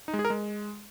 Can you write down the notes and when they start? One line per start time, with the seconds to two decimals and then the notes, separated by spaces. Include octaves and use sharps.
0.08 D#4
0.13 G#3
0.19 G#4
0.25 A#4
0.30 G#3